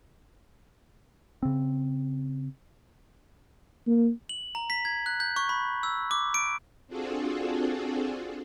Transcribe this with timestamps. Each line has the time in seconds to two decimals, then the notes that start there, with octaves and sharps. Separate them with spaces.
1.43 C#3 C4
3.87 A#3
4.29 F#7
4.55 A#5
4.70 B6
4.85 G#6
5.06 F#6
5.20 G6
5.36 C#6
5.49 B5
5.83 E6
6.11 D6
6.34 D7
6.88 C4 D4 F4 F#4 G#4 A4